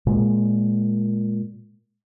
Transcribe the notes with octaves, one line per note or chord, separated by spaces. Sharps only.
A#2 G#3